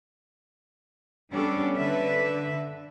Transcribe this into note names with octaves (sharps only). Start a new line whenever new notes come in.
G3 B3 C#4 D4 A4
D3 B4 E5